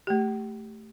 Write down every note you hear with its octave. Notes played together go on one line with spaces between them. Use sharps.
A3 G4